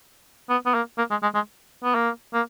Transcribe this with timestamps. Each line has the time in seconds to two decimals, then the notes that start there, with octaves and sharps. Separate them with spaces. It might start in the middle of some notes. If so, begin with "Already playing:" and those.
0.49 B3
0.66 B3
0.74 A#3
0.98 A#3
1.11 G#3
1.23 G#3
1.35 G#3
1.83 B3
1.95 A#3
2.34 A#3